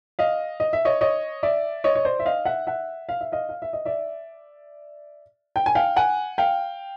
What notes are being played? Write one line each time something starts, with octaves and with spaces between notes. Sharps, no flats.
D#5 F5
D#5
E5
C#5 D#5
C#5 D#5
D5 E5
C#5 D#5
C#5
C5 D5
E5
D#5 F5
E5 F#5
E5 F#5
F5
E5
D#5 F5
F5
E5
D#5
D5 E5
G5
G#5
F5 G5
F#5 G#5
F5 G5